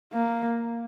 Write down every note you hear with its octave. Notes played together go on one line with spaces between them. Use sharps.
A#3